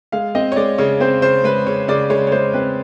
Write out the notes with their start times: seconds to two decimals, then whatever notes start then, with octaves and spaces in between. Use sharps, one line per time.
0.12 G#3 F5
0.35 C4 D#5
0.52 C#5
0.56 G#3 D5
0.78 C#3 C#5
1.00 C4 C5
1.22 C#3 C5
1.44 G#3 B4
1.67 C#3 C#5
1.88 C#3 D5
2.10 G#3 C#5
2.27 C#5
2.32 G#3 C5
2.53 C4 B4